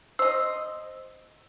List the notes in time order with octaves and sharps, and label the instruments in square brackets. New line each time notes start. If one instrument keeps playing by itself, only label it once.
[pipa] C5 D#5 [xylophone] E6